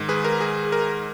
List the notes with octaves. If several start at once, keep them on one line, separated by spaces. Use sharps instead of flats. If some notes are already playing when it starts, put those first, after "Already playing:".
Already playing: G#2 D#3
G#4 B4
A#4
G#4
A#4